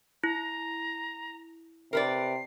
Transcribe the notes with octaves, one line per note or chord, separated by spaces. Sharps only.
E4 A#5
C3 A#4 B4 D5 C7